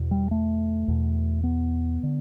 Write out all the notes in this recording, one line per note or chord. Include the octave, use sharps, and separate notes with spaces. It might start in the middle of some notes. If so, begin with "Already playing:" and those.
Already playing: E2 B2
G3
A3
E2 B2
B3
D3